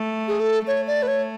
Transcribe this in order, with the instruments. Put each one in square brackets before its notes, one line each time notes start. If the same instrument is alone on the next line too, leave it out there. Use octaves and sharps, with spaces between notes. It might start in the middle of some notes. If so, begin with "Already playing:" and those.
Already playing: [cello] A3
[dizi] G#4
A4
[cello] A3 [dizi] C#5
[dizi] D5
B4
C#5